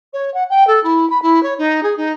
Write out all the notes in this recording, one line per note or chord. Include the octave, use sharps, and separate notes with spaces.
C#5
F#5
G5
A4
E4
B5
E4
C#5
D#4
G#4
D#4